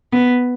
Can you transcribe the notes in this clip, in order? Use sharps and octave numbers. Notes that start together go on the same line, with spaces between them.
B3